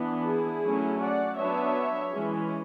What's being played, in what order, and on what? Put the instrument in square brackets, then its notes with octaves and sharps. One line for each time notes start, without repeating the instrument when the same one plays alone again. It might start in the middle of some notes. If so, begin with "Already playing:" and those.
Already playing: [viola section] E3 B3 D4
E4 G#4
F#3 A3 C#4
D5 F#5
F#3 B3 D4 C#5 E5
E3 G#3 C#4